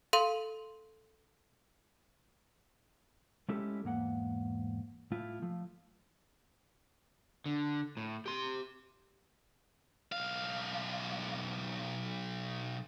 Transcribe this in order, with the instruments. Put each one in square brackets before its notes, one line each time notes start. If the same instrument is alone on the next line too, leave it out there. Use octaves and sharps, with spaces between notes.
[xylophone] A4 F5 C6 D#7
[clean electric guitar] G#3 A3 C#4 E4 G4 A4
E2 G#2 A#3 F#5
A2 A3 E4 F4
F3 A3
[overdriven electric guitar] D3
A2
G4 C6
[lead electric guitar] B1 F5